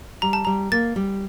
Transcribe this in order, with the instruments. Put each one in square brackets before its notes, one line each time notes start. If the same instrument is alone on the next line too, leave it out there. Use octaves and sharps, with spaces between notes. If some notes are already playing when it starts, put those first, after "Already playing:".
[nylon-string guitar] G3 [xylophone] A#5
[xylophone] A5
[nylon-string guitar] G3 [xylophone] A#5
[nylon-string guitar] A#3 [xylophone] A6
[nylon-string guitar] G3